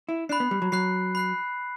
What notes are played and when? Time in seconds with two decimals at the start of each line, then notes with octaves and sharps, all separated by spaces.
0.09 E4
0.29 D4 B5 F#6 C7
0.40 B3
0.51 G3
0.62 F#3
0.72 F#3 B5 F#6 C7
1.15 B5 F#6 C7